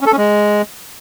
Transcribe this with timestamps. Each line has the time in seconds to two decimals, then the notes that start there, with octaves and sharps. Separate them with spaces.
0.01 C#4
0.06 A4
0.12 C#4
0.17 G#3